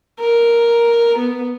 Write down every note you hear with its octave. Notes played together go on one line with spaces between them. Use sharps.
A#4
B3